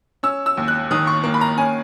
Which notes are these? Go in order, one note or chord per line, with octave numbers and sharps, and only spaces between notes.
C#4 E6
E6
D#2
F#6
D#3 D#6
C#6
A#3
B5
A#5
C#4 G#5